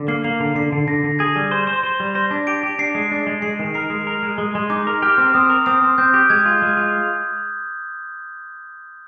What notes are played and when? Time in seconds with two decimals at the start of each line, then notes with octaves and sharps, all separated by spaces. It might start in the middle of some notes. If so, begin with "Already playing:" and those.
Already playing: D3
0.08 A#3 C7
0.24 A#3 C7
0.40 D3
0.55 D3 C7
0.72 D3
0.87 D3 A#6
1.04 D3
1.19 G#4 G#6
1.36 G3
1.51 C5
1.67 C5
1.83 C5
2.00 G3
2.15 C5 A#6
2.31 D4
2.47 G4 D7
2.63 G4
2.79 D4 C7
2.95 G#3
3.12 D4
3.27 G#3
3.42 G#3 C7
3.59 D#3
3.74 A#4 C7
3.90 G#3
4.07 A#4
4.23 G#3
4.38 G#3
4.54 G#3 C6
4.70 D#4 D6
4.87 A#4
5.02 G4 F6
5.18 C4
5.34 C4 D#6
5.50 A#4
5.66 C4 D#6
5.82 C4
5.98 C4 G6
6.14 G4
6.30 G#3 G#6
6.46 F4
6.62 G#3
6.77 F4